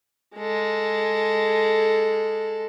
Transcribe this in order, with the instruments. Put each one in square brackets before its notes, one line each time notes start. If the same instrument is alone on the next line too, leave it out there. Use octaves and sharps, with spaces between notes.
[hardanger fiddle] G#3 A4